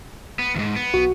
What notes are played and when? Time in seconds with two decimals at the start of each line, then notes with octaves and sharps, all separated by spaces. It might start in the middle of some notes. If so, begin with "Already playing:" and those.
0.39 B3
0.56 D#2 G#2
0.76 B3
0.94 B1 F#4